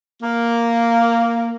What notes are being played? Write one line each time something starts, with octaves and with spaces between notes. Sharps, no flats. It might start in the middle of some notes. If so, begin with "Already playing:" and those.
A#3